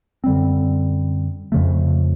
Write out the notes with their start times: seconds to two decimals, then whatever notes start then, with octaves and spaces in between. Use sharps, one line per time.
0.24 F#2 D3 G3 C4
1.52 F2 C#3 F3 A3